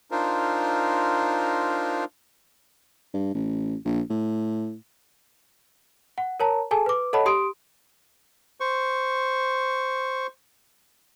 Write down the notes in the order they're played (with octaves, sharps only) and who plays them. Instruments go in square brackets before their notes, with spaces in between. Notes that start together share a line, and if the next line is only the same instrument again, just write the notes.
[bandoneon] D4 D#4 F4 A#4 C5
[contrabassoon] G2
A1
A#1
A2
[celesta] F#5
A#4 C#5 A5 A#5
G#4 A4 G#5 A5
B4 D6
A4 C#5 D#5 F#5 A5 B5
G4 C6 D#6 D7
[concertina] C5 C#6